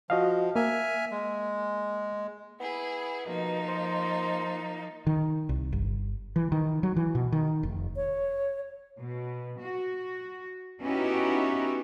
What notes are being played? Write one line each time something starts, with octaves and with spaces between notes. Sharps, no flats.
F3 F#4 D#5 F5
A#3 E5 G#5 F6
G#3
B3 E4 G#4
B2 F3 A#3 D#4
C5
D#3
C2
G1
E3
D#3
F#3
E3
B2
D#3
F1
C#5
B2
F#4
B3 C#4 D#4 E4 F#4 G4